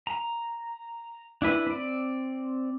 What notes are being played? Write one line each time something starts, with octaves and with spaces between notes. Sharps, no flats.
A#5
D4 E4 B4
C4 D5